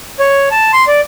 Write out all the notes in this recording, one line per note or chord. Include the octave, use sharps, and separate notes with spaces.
C#5
A5
C6
D5